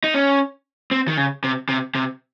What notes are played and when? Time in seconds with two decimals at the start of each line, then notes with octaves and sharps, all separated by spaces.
0.04 D#4
0.14 C#4
0.91 C4
1.08 D#3
1.17 C#3
1.44 C3
1.69 C3
1.95 C3